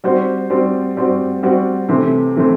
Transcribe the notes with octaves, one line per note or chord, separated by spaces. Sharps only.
G3 C4 F#4 C5
G3 C4 F#4 C5
G3 C4 F#4 C5
G3 C4 F#4 C5
C3 E3 A3 C4
C3 E3 A3 C4